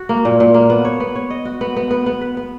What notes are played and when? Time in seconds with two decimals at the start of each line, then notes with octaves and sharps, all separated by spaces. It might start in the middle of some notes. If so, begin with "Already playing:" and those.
Already playing: F#4
0.09 A#3
0.25 A#2
0.40 A#2
0.54 A#3
0.70 B3
0.85 C#5
1.00 B3
1.15 C#5
1.30 D#5
1.45 F#4
1.61 B3
1.76 B3
1.91 B3
2.06 B3
2.21 B4
2.37 B3